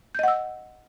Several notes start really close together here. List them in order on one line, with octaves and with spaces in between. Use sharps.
G6 D#5 F#5 E6